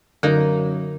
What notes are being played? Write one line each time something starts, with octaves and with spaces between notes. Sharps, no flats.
F#2 D3 A#3 D#4